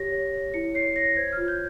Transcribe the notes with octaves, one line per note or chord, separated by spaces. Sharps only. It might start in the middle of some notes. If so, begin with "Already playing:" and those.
Already playing: G4 C#5 A#6
C#5
C#5
E4 C#7
C#5 C7
C#5 A#6
C5 G#6
F4 F6
G6